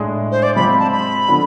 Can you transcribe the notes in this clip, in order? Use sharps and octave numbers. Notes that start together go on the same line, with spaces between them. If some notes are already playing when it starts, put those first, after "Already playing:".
Already playing: A2 G#3 D4 G#4
C5
D5
C3 G#3 C4 F4 B5
A5
B5
D3 F3 B3 D4